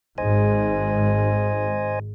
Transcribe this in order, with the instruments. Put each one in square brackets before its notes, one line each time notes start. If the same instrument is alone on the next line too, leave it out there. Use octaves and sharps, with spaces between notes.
[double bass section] G#1 G#2 [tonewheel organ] C5 D#5 G#5